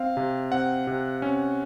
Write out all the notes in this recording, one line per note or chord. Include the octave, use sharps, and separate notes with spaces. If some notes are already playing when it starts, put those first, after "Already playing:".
Already playing: C4 F5
C3
C4 F#5
C3
C#4